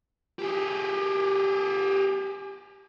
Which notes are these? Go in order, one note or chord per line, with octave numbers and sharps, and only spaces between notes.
G4 G#4